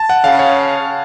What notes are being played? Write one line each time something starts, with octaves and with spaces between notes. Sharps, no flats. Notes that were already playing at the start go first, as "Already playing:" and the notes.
Already playing: A5
F#5
C#3 F5
C#5